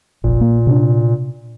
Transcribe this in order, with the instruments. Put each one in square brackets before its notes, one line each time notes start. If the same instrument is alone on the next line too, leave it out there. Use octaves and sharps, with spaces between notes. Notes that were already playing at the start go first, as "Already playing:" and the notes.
[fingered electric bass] F1 A#1 [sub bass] A#2
[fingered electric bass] A#3
C3 D4